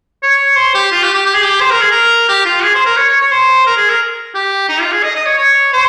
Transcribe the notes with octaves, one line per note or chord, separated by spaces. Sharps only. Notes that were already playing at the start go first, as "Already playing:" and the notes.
C#5
C5
G4
F4
G4
G4
G4
G#4
G4
C5
A#4
G#4
A#4
G4
F4
G#4
C5
A#4
C#5
C#5
C#5
C5
A#4
G#4
A#4
G4
D#4
F4
G#4
D#5
D#5
C#5
C#5
C5